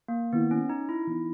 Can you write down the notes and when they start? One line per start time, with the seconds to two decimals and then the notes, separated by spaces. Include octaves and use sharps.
0.08 A#3
0.33 D#3 A#3 B3 E4
0.51 C#4
0.69 D#4
0.89 E4
1.07 E3 B3 D#4